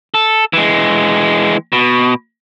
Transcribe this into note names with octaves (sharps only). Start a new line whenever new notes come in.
A4
E3 G#3
B2